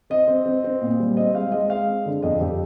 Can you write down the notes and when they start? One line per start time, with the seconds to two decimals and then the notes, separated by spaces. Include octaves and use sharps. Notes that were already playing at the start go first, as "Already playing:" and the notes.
0.10 C4 D#5
0.28 C4
0.46 C4
0.64 C4
0.82 A#2
1.00 G3
1.17 C4 D#5
1.34 G#3 F5
1.52 G#3 D#5
1.70 G#3 F5
1.87 C4
2.06 D3
2.23 F2 D#5
2.41 F2 G4